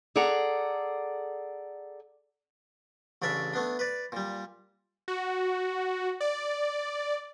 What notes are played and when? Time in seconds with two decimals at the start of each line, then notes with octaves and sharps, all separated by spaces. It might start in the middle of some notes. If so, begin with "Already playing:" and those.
0.16 G#4 A4 D5 F#5 A#5
3.22 A1 C#3 D4 D5 E5
3.54 A3 B3 D4
3.79 B4 D5
4.12 A#2 G3
5.08 F#4
6.21 D5